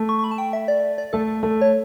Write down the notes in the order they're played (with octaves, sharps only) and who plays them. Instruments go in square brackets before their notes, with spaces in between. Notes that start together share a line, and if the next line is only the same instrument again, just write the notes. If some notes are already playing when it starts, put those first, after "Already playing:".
Already playing: [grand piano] A3
[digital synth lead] C#6
C#6
B5
A5
G5
E5
D5
D5
[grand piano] A3 [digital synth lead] A4
[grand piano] A3
[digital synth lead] C#5